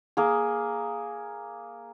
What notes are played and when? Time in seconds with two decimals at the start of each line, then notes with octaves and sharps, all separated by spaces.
0.17 A#3 G#4